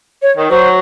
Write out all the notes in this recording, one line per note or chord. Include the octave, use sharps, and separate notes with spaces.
C#5
D#3
F#3 C5